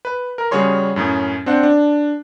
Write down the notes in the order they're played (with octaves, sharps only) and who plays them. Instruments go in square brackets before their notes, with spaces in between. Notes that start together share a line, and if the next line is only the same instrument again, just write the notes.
[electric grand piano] B4
A#4
C#3 G3 F#4 G#4 C#5 C6
F#2 A2 C#4
C4 D4 C5 F#5
D4